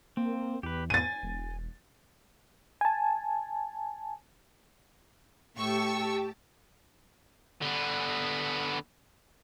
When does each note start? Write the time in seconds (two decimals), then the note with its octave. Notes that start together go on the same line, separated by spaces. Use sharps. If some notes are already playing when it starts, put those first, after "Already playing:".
0.17 A#3 C4
0.63 E2 G4 B4
0.90 G#5 A6 D#7
1.23 E1
2.81 G#5 A5
5.57 A2 G4 G5 A5 C#6 E6
7.62 D3 B3